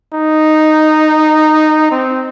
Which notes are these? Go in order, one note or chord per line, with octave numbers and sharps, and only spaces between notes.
D#4
C4